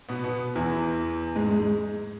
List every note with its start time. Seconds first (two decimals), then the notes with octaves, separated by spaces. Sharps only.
0.09 B2 B3
0.24 B2 B3
0.56 E2 E3
1.36 G#2 G#3
1.51 G#2 G#3